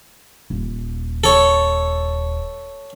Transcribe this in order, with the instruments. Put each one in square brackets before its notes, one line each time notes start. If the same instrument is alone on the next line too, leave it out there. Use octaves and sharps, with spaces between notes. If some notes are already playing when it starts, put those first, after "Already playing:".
[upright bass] D#1
[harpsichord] A4 C#5